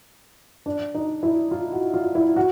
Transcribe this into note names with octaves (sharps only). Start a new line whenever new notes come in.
D4
D#4
E4
F4
F#4
F4
E4
F#4